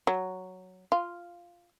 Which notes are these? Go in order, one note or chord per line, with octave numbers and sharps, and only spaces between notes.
F#3
F4